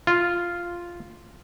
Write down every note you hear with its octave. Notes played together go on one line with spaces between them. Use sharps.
F4